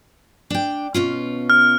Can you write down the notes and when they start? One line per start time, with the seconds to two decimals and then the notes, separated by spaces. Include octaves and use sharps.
0.50 D4 G5
0.94 B2 C#4 F4
1.50 F6